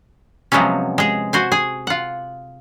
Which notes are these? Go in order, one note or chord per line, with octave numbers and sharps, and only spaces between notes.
C3 F3 F#3 G#3 B3 C#4
G#3 G#4
F#4 C5 G#5
G#4 G#5
F4 F#5